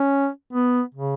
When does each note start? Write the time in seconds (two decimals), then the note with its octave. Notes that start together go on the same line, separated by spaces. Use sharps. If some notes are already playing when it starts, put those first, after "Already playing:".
Already playing: C#4
0.53 B3
0.94 C#3